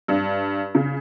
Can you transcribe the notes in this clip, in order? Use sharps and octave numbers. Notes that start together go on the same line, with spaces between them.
G2
C#3